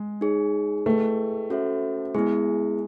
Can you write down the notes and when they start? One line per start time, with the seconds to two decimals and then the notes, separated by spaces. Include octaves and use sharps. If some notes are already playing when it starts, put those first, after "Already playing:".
Already playing: G#3
0.21 D#4 G#4 C#5
0.86 A3 E4 G#4 B4 D#5 G5
1.50 C#4 F#4 A4 C5 E5
2.15 G#3 B3 E4 G#4